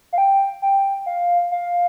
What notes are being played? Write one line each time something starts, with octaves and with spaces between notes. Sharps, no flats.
F5
G5
G5
F5
F5